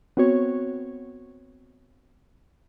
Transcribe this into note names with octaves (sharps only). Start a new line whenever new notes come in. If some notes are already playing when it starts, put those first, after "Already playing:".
B3 C4 F#4 C#5